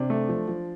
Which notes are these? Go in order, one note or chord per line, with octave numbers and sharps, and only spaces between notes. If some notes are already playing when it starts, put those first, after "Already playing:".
Already playing: C3 D4
A3
F3
F3